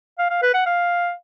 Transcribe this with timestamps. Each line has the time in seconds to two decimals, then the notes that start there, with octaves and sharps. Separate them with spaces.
0.18 F5
0.30 F5
0.42 B4
0.54 F#5
0.66 F5